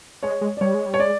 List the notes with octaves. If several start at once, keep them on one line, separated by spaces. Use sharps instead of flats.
G#3 C#5
G#3
D5
G3 C#5
G#3
G3
C#5
G#3 D5